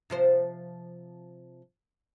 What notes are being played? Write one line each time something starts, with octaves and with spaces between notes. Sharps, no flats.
C3 F3 C5